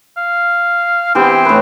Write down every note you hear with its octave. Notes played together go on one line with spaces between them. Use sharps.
F5
E3 B3 C4 G4
A2 B4